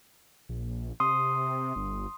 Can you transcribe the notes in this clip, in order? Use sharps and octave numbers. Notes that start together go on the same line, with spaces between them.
A#1
C3 C6 D#6
G1